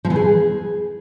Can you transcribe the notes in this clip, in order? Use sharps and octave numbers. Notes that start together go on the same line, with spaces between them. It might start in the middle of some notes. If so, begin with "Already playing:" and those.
F3
E3
G#4